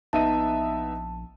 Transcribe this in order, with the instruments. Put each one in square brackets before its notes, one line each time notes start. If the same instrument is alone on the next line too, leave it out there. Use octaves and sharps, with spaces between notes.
[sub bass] A#1 [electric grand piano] B3 E5 D#7 [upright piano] D#4 [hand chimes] A5